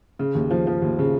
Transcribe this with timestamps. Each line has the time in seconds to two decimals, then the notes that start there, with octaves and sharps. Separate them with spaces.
0.19 C#3
0.35 D#2
0.51 F3
0.67 F3
0.82 D#2
0.99 C#3